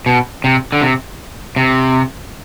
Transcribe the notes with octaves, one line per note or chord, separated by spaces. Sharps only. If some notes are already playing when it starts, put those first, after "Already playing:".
B2
C3
D3
C3
C3